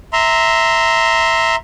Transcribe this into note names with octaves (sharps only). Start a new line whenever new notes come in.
E5 A#5 C6